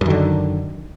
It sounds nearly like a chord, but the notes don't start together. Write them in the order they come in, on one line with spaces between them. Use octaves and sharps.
F#2 D#3 D3